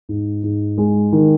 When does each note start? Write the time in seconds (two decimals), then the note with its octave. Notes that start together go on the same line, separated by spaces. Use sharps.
0.09 G#2
0.44 G#2
0.78 G#3
1.12 D#3